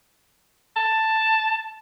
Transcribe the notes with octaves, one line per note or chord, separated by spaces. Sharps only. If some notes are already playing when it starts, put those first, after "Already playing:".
A5